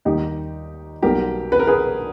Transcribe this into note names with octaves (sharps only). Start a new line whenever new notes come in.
D#2 D#3 G3 D#4 G4
B1 B2 G3 G4 A#4
B4
A#4
G#4 B4